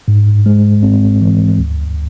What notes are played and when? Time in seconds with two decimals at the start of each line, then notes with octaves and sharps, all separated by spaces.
0.08 G#2
0.46 G#3
0.83 C4
1.21 E3
1.58 D2